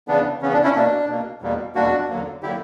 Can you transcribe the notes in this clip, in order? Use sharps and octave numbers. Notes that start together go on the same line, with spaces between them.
C#3 E3 B3 D4
C#3 E3 B3 C#4
D4
C#4 E4
B2 A#3 D4
B2 A#3
E2 B2 G3 A#3
E2 B2 G3 A#3 D4 F#4
E2 D3 F#3 A#3
D3 F#3 A#3 E4 G4